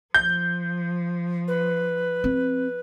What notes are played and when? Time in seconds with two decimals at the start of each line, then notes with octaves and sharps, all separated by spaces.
0.14 F3 G6
1.48 B4
2.24 C4